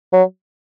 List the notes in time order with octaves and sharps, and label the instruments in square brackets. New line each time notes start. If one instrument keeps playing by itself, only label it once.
[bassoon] F#3